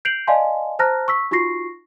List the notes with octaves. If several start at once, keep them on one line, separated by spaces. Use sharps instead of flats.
G6 C7 D7 F7 F#7
D5 D#5 F5 G#5 A5 C6
C5 A5 A#5 F6 F#6 A#6
C#6 E6 B6
D#4 F4 F#4 C#6 A#6 C7